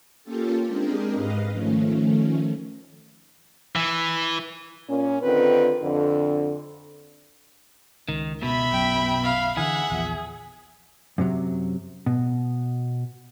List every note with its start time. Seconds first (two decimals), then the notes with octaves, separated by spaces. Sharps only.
0.24 A#3 C#4 F4 G4 A4
0.67 G#3 C4 D4 G4 G#4 A#4
1.12 G#2 B4 D#5 F5
1.51 D#3 F3 A3 C#4
3.76 E3
4.87 A#2 C#4
5.23 D3 D#3 C4 F4 B4
5.82 F2 D3
8.08 C#2 D#3
8.43 B2 E5 B5
8.72 B1 F#2 G5
9.24 F5
9.57 D3 E3 G#4 E5 F#5
9.90 A#1 E2 F3
11.18 F#2 C3 F#3
12.06 B2